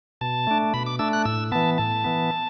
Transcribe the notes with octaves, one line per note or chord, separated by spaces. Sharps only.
B2 A5
A3 D4
B2 B5
D6
A3 D4 E6
F#6
A2 E6
E3 B3 A5
A2 A5
E3 B3